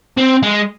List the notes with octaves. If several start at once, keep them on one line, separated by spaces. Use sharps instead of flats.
C4
G#3